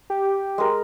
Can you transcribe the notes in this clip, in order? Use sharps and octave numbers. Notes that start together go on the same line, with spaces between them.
G4
G#3 A#4